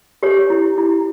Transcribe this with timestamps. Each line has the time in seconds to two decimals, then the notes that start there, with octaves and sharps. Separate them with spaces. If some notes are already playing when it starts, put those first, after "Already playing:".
0.23 G4 C#5
0.50 E4
0.78 E4